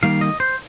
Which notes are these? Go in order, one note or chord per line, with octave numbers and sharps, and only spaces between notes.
D#3 G3 A#3 F5
D#5
C5